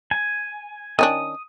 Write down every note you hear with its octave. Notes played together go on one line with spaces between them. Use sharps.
G#5
D#3 C#4 D4 D#6